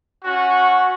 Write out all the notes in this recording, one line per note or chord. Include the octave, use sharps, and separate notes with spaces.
C#4 F#4